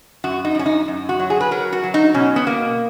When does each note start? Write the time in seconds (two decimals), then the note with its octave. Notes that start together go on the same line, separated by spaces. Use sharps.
0.24 F#2 F#4
0.45 D#4
0.55 F#2 C#4
0.66 D#4
0.88 F#2
1.09 F#4
1.19 F#3
1.30 G#4
1.40 B4
1.51 F#3 A#4
1.72 F#4
1.84 F#3
1.94 D#4
2.14 B2 C#4
2.36 B3
2.47 A#3